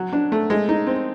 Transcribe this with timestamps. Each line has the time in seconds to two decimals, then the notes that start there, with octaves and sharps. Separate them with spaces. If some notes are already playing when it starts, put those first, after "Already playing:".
Already playing: F#3
0.13 D4
0.32 A3
0.50 G#3
0.69 D#4
0.87 C4